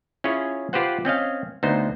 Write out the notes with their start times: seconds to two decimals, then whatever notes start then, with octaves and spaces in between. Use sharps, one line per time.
0.24 C#4 E4 F4 G#4 C#5
0.73 F4 G4 B4 C5 F#5
1.05 C4 C#4 D#5 F5
1.63 D2 B3 D#4 C5